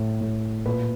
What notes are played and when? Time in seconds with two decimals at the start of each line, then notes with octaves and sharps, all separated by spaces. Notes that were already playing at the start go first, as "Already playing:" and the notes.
Already playing: A2
0.21 A2
0.66 A#2 B4